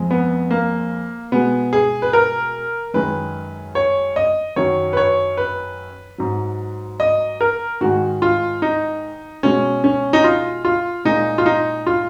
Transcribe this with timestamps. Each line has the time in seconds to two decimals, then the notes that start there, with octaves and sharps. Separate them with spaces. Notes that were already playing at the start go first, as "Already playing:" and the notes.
Already playing: F2 F3 G#3
0.11 B3
0.51 A#3
1.32 B2 G#3 B3
1.73 G#4
2.02 B4
2.13 A#4
2.94 F#2 D#3 G#3 B4
3.75 C#5
4.16 D#5
4.56 F#2 D#3 F#3 C#5
4.93 B4
4.97 C#5
5.37 B4
6.18 G#2 F#3
7.00 D#5
7.41 A#4
7.81 G#2 D#3 G#3 F#4
8.22 F4
8.62 D#4
9.43 B2 G#3 C#4
9.84 C#4
10.13 D#4
10.24 F4
10.65 F4
11.05 A#2 G#3 D#4
11.38 F4
11.46 D#4
11.87 F4